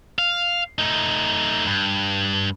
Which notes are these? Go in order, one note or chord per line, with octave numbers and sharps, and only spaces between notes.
F5
A3 D#4
G2